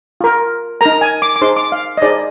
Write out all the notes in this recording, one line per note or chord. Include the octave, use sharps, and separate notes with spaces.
F4 A#4
D#4 A#4 A#5
G#5
D6
D6
D#4 G#4 C5 C6
D6
F5
D#5
D#4 G#4 C5 D5